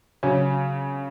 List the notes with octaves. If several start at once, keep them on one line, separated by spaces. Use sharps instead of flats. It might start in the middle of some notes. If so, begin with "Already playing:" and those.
C#3 F#3 C#4